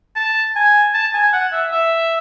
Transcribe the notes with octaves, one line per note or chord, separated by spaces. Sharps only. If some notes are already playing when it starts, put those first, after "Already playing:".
A5
G#5
A5
G#5
F#5
E5
E5